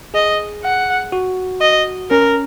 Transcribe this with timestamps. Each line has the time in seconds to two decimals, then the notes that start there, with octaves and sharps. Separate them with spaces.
0.14 G#4 D#5
0.64 F#5
1.12 F#4
1.61 D#5
2.10 C#4 A#4